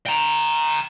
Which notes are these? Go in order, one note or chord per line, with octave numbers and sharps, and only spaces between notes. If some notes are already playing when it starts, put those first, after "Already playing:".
G5 A#5